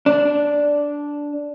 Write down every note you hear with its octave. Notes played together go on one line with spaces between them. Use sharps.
D4